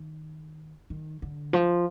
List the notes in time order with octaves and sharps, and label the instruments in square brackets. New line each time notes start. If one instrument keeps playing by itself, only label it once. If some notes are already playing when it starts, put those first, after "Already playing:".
Already playing: [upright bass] D#3
D#3
D3
F3